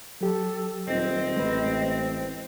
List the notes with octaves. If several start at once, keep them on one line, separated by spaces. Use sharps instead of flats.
F#3 G4 A4
D#1 C4 D#5
A1 G#3 B4